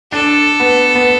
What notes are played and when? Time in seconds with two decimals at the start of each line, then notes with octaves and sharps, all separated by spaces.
0.12 D4 A4
0.60 B3
0.95 B3